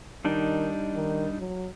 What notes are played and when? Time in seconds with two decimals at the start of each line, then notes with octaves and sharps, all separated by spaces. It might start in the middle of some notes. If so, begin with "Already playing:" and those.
0.25 D#3 G3 D4 D#4
0.95 D#3
1.38 F#3